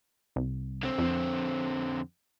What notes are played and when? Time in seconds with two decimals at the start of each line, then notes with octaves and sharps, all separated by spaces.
0.36 C2
0.83 D3 C4
0.98 F2